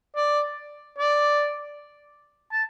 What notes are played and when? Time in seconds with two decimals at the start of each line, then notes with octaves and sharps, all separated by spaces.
0.16 D5
0.99 D5
2.52 A5